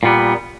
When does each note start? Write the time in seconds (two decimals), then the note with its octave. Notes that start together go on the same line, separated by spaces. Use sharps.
0.03 A#2 G3 B3